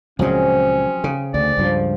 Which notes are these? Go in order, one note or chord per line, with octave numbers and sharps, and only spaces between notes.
C#2 A#2 F3 F#3 C4 C#4 G#4
C#3
D2 D5
C#2 G2 F3